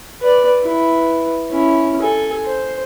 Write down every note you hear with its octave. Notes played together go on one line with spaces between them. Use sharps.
B4 D5
E4 B4
C#4 E4
A4 G#5
C5